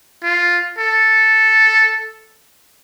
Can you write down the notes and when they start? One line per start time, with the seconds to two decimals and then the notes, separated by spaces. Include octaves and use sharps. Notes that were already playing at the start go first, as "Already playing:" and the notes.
0.23 F4
0.78 A4